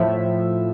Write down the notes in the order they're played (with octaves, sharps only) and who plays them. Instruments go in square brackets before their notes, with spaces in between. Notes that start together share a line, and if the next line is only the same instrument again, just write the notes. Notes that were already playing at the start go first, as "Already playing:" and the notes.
Already playing: [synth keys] A2 F3 E5